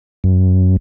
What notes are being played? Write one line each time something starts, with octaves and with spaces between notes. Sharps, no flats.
F#2